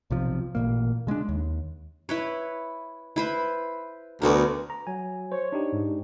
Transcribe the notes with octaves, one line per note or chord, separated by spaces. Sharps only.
B1 C3 F3
A1 A#2 A#3
C#3 G#3 A#3 D4
D#2
E4 B4 C#5
E4 B4 C5
D2 B3 F#4 A#4
A#5
F#3 G#5
C5 C#5
D4 D#4 G4
G#2